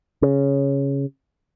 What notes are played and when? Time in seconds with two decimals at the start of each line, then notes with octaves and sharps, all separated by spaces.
0.22 C#3